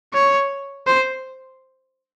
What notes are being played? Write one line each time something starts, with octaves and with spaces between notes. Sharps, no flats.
C#5
C5